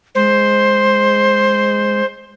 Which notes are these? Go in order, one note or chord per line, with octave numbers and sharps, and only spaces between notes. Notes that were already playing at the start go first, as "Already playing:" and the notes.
G#3 C5